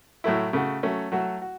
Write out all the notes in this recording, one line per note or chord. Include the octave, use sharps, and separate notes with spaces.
A2 F#3 A3 E4
C#3 A3 F#4
F#3 A3 C#4
F#3 A3 F#4
F#4